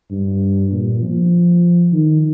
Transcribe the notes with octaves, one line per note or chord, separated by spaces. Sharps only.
G2
A#2
F3
D#3